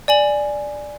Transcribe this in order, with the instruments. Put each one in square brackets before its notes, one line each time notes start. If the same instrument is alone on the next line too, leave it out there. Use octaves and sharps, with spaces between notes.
[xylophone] D5 G#5 F#7